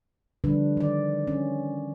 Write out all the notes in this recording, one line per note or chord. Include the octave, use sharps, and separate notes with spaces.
D3 F3 G3 D4 B4
D#3 D5
C#4